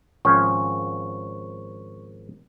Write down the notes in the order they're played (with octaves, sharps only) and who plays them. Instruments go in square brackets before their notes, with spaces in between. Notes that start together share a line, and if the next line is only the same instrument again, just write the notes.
[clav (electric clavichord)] G#1 F3 C#4 [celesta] C#6